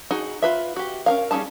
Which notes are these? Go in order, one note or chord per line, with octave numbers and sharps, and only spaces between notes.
D#4 F#4 G#4
F4 B4 E5
F#4 G4
C#4 A#4 F5
G3 C#4 D#4 G#4 A5